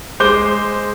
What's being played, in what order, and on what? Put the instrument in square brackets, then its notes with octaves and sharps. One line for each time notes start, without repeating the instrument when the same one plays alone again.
[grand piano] G#3 C5 D6 G6 G7